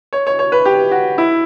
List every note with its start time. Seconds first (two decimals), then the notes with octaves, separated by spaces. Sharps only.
0.13 C#5
0.27 C#5
0.39 C#5
0.52 B4
0.65 G4
0.92 F#4
1.18 E4